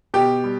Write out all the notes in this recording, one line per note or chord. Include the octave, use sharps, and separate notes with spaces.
B2 G4
G3